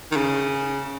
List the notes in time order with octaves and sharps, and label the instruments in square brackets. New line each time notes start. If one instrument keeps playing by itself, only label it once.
[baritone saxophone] D#3
C#3